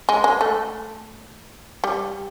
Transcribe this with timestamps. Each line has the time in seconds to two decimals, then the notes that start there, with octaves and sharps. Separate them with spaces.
0.09 G#3
0.24 G#3
0.41 A3
1.84 G3